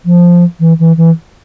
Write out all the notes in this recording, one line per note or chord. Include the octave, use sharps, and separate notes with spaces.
F3
E3
E3
E3